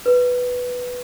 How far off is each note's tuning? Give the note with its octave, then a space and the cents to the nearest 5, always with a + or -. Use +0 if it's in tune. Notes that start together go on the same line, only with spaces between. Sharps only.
B4 +0